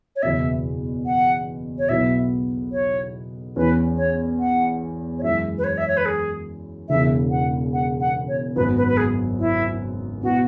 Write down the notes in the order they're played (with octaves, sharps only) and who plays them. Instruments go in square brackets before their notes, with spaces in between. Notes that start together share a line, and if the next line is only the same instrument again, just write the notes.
[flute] C#5
[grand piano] F#1 E2 B2 B3 [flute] E5
[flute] F#5
C#5
[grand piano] B1 B2 F#3 B3 E4 [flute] E5
[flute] C#5
[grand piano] E2 E3 C#4 [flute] B4
[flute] C#5
F#5
C#5
[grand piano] F#2 E3 G#3 [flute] E5
[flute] B4
C#5
E5
C#5
B4
G#4
[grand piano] E1 E2 C#3 E3 [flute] E5
[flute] F#5
F#5
F#5
C#5
[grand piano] G#1 F#2 F#3 B3 [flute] B4
[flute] B4
B4
G#4
E4
[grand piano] B2 B3 E4 [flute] F#4